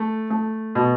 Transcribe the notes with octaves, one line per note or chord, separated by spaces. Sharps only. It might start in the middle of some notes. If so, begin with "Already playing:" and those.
Already playing: A3
A3
B2